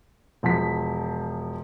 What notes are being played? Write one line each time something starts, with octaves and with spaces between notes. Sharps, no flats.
E1 F3 B6